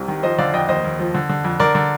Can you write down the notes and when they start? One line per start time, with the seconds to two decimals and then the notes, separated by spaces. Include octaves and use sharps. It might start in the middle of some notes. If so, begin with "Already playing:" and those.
Already playing: C2 C3
0.08 D#3
0.23 F3 C5 D#5
0.38 D3 D5 F5
0.54 F2 D#5 G5
0.69 D#2 C5 D#5
0.84 D#2
0.99 F3
1.14 D3
1.29 D3
1.44 F2
1.60 D3 A#4 D5
1.75 D3